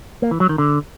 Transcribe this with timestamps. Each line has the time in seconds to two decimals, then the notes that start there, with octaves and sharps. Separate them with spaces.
0.22 A#3
0.31 E3
0.40 F#3
0.49 D#3
0.58 D3